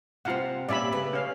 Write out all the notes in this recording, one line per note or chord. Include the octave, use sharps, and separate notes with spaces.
C3 C4 F4 F5 F#5
A#2 C#4 G4 D5 E5 B5
C#3 A3 B4
C#4 F5